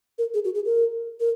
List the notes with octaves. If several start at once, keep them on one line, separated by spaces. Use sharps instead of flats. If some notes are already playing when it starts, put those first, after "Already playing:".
A#4
G#4
F#4
G#4
A#4
A#4